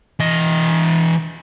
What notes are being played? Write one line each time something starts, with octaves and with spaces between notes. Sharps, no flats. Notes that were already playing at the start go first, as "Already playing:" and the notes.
E3 D#5